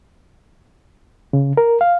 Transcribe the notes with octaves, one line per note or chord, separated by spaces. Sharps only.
C#3
A#4
F5